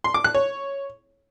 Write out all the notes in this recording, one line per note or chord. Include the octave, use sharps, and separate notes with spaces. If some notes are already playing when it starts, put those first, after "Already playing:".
C6
D6
F#6
C#5